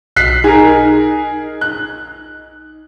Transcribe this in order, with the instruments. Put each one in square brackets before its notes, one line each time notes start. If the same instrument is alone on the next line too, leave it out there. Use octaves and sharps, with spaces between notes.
[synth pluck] B1 [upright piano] F#6 B6 C7
[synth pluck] D#4 [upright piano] G#4 A#4
[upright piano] F#6